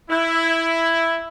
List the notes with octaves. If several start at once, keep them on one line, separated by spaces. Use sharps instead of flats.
E4